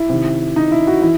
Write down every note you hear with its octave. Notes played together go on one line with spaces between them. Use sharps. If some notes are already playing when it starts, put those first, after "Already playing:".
Already playing: E4
C3 D#3
D#4
E4
F#4
E3 E4